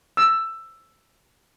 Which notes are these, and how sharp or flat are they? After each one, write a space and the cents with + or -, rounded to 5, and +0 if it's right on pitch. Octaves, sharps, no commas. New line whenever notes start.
E6 +10